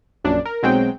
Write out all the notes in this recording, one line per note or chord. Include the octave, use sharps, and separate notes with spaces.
A#1 F#2 D4
A#4
B1 F#3 G#3 C4 G5